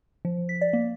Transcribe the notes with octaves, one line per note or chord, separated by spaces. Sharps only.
F3
B6
D5
A#3